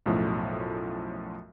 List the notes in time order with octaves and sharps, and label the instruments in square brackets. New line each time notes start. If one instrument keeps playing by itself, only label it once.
[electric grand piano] B1 F#2 A2 F3 A3